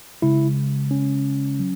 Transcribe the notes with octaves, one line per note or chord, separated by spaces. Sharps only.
C#3 G#3 E4
C#4
F#3